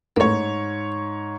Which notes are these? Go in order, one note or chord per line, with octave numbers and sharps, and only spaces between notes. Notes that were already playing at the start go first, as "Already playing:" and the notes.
A1 G#2 A#3 C#5